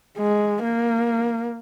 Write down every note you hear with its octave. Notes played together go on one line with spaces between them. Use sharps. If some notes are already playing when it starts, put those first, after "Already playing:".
G#3
A#3